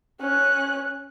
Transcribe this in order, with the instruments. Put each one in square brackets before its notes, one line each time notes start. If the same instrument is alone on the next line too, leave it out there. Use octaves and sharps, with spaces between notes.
[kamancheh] C#4 F#6